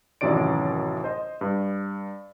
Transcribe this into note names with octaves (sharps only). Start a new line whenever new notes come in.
A1 F#2 C3 D#3 D5 D7
C5 D#5
G2